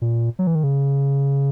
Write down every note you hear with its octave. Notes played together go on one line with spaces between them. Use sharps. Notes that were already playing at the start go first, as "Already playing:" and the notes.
A#2
F#3
E3
D#3
C#3